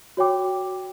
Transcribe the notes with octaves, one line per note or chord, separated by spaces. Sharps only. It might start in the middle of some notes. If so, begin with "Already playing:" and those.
F#4 C#5 G5 D6